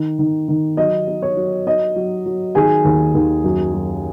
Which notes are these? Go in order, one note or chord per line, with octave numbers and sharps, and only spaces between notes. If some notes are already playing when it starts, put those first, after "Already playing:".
Already playing: D#3
D#3
D#3
F#3 D#5
D#4
C#5
F#3
D#4 D#5
F#3
F#3
D#3 G#4 G#5
D#2
D#2
F#2
F#2